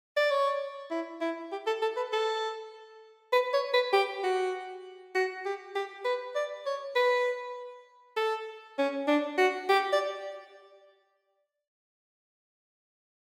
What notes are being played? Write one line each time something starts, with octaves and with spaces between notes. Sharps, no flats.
D5
C#5
E4
E4
G4
A4
A4
B4
A4
B4
C#5
B4
G4
F#4
F#4
G4
G4
B4
D5
C#5
B4
A4
C#4
D4
F#4
G4
D5